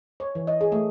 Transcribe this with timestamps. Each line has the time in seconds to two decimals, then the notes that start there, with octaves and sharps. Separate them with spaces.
0.20 C#5
0.35 E3
0.47 D#5
0.61 G#4
0.72 A3